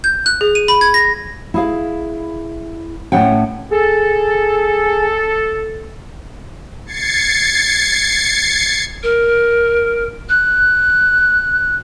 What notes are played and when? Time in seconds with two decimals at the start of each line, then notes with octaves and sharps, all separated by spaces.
0.04 G6
0.26 F#6
0.41 G#4
0.55 D#7
0.68 B5
0.81 G#6
0.94 A#6
1.54 E4 G#4 F5
3.12 A2 A3 A#3 C#4 F#5 G5
3.71 G#4 A4
6.86 G#6 A6 C7 C#7
9.03 A#4
10.29 F#6